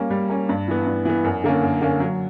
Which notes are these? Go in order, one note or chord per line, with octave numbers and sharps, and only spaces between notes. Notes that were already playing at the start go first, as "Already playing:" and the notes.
Already playing: G3 A#3 C#4
G3
A#3 C#4
G2
E3 B3
G2
E3 B3
F#2
D3 A#3 C#4
F#2
D3 A#3 C#4
F#3